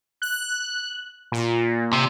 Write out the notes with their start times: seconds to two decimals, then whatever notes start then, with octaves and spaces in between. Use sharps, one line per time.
0.22 F#6
1.32 A#2
1.93 C3